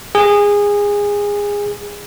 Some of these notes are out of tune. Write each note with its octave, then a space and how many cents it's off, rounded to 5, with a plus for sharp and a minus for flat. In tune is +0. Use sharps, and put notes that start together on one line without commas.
G#4 -20